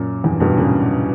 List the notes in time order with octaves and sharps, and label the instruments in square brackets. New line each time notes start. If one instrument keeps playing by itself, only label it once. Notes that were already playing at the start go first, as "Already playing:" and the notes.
Already playing: [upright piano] F#2 A#2
E2 G2
G2 B2
A#2 C#3